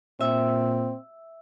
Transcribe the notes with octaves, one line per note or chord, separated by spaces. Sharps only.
A#2 C4 E5